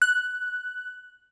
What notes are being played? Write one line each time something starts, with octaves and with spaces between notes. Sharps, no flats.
F#6